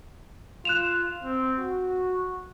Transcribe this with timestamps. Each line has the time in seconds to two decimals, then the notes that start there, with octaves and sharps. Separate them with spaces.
0.65 F4 F#6 E7 F7
1.23 C4
1.59 F#4